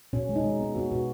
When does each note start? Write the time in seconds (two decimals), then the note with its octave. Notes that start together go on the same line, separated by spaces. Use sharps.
0.13 B2 C#4
0.29 G#3
0.36 D#4
0.44 G#3
0.60 B3
0.75 B3 F#4
0.91 B2 F#4